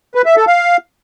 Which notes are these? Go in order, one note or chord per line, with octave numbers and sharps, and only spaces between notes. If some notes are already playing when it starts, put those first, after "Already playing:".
B4
E5
A4
F5